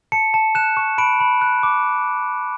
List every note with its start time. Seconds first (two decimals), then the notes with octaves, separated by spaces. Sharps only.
0.12 A5 C#7
0.34 A5
0.55 F#6 E7
0.77 C#6
0.98 B5 D7
1.20 B5
1.42 F#6
1.63 D6